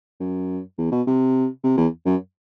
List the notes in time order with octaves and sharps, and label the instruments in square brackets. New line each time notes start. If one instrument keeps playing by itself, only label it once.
[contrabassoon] F#2
E2
B2
C3
C3
E2
F#2